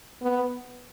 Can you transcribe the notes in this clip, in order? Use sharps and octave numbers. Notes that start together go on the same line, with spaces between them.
B3